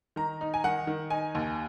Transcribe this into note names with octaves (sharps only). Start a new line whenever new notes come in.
D#3 A#5
D#4
G#5
D#3 F#5
D#3
D#4 G#5
D#2